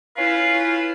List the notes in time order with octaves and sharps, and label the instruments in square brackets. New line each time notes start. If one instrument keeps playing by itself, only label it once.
[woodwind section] C#4 E4 F4 B4 F5